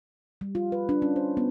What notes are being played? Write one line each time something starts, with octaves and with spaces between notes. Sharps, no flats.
G3
F4
B4
D4
C#4
C5
B3